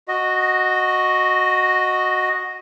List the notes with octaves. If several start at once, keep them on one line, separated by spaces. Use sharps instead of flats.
F#4 D#5